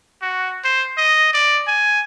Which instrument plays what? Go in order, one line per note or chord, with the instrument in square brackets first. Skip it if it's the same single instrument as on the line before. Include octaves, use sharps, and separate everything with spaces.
[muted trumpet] F#4
C5
D#5
D5
G#5